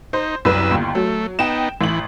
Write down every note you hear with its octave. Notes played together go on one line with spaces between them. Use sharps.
D#4 C5
C2 F#2 B4 E6
G1 D#2
F#3 A3
B3 D#4 G5 E7
A1 E3 F#7